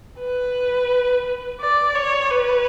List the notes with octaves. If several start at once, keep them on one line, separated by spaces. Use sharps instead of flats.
B4
D5
C#5
B4